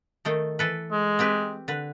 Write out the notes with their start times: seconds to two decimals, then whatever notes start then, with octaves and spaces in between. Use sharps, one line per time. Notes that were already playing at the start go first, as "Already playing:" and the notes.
0.25 D#3 A3 D#4
0.59 E3 A4 B4
0.92 G#3
1.19 C4 G4 B4
1.68 D3 B4